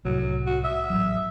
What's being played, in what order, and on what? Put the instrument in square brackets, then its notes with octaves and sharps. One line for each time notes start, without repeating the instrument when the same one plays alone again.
[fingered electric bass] C2 A2 [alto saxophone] F#3
[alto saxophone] F#4
E5
[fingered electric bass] A1 F#3